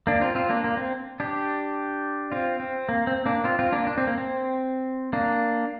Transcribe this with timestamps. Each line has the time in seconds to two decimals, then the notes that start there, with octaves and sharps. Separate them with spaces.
0.07 A#3 D4
0.21 C4 F4
0.35 C4 F4
0.50 A#3 D4
0.64 A#3
0.77 C4
1.20 D4 G4
2.32 C4 F4
2.60 C4
2.89 A#3
3.07 C4
3.26 A#3 D4
3.44 C4 F4
3.59 C4 F4
3.72 A#3 D4
3.87 D4
3.98 C4
4.07 A#3
4.18 C4
5.13 A#3 D4